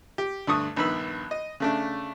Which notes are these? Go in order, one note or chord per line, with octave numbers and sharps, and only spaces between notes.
G4
D2 G2 A3 C#6 D#6
A#1 G2 D#3 B3 B5 E6
D#5
C#3 A3 D4